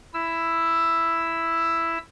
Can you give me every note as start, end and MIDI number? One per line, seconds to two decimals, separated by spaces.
0.14 1.98 64
0.14 1.98 88